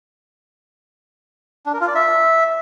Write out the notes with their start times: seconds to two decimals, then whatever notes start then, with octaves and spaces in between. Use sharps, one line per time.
1.66 D4
1.73 A#4
1.81 F4
1.88 D5
1.95 E5